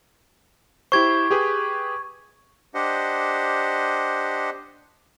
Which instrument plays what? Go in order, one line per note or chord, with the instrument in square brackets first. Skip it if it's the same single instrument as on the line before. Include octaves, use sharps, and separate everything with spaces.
[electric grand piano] E4 G4 C5 [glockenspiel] C#6 G#6
[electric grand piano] G4 G#4 B4
[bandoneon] D4 G4 C5 D#5 F#5